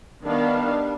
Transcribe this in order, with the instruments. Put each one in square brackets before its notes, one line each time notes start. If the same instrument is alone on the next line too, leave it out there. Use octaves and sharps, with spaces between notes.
[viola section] D#3 B3 F5 [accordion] G3 D4